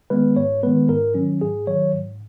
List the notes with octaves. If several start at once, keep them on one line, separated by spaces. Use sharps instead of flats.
D#3 G#3 B3 B4
G#2 C#5
D#3 G#3 B3 B4
G#2 A#4
D#3 F#3 C#4
G#2 G#4
D#3 F#3 C#5
G#2